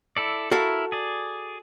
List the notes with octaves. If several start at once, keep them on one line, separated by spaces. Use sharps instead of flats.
E4 A4 D5
E4 F#4 A4 A#4 F5
G#4 D5